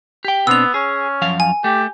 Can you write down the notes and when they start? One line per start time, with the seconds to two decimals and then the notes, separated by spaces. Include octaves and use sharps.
0.25 G4 G5
0.47 B2 B3 C4 D4 E6 F7
0.74 C#4 G#4
1.22 F#2 F3 F5
1.40 G#5
1.64 A3 G4